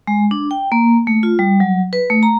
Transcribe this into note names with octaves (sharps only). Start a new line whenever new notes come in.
G#3
D4
G5
A#3
A3
F4
G3
F#3
B4
A3
A#5